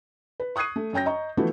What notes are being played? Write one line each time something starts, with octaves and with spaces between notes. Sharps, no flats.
B4
C#6 D#6 F#6 G#6 C7 D#7
A3
F#2 C#5 G5 G6 A#6
D#5 A#5 C#6
E3 F3 A3 B3 E4 F#4